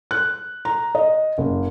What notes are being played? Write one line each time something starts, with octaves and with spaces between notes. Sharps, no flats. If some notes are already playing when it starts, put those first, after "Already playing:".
F#6
A#5
D#5
F#1